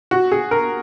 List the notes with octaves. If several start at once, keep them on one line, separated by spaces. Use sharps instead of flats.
F#4
G#4
A#4